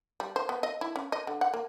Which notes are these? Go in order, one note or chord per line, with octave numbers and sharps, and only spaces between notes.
G3
C5
B3
D#5
E4
C#4
D#5
D3
F#5
A#3